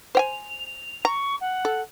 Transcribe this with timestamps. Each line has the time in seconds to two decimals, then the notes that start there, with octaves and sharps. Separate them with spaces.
0.15 C5 G5 G#5 F7
1.05 A#5 C#6
1.40 F#5
1.65 A4